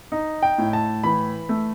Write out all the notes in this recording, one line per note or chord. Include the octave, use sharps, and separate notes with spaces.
D#4
G5
A2
A5
E3 B5
A3